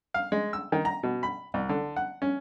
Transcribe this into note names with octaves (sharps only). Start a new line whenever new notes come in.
F5
G#3
E6
D#3
A#5
B2
B5
C2
D3
F#5
C#4